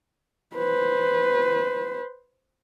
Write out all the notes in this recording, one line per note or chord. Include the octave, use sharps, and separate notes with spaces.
B4 C5